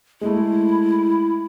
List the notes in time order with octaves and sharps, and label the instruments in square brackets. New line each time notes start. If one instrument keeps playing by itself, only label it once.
[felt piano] G#3 A3 [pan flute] E4